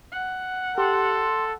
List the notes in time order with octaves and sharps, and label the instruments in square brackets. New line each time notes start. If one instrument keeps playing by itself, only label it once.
[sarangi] F#5
[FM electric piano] G4 [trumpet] A4 [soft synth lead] C6